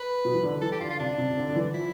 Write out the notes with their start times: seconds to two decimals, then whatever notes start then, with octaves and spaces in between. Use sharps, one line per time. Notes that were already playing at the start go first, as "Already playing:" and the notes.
Already playing: B4
0.25 B2
0.34 E3
0.43 D3
0.61 E3 A4
0.72 G4
0.80 D3 F4
0.91 F4
0.99 C3 D4
1.18 C3
1.30 C3
1.37 D3
1.49 D3
1.56 E3
1.74 F3 E4